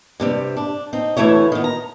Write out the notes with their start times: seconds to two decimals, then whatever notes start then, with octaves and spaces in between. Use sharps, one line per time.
0.20 G2 C3 G3
0.57 D4
0.93 C4 D#4
1.17 D2 E3 F#3 A3 E4 C#5
1.52 D#3 B3
1.64 A#5